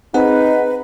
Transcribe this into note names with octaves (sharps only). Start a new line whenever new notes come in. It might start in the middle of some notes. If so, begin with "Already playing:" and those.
C4 D#4 G#4 B4 F#5